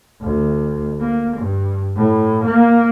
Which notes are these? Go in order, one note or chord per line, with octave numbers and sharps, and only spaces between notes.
D2
A#3
G2
A2
A#3